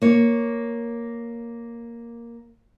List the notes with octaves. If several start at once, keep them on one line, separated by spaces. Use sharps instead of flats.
A#3 C#5